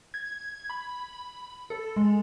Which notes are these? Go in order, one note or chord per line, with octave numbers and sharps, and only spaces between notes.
G#6
B5
A4
G#3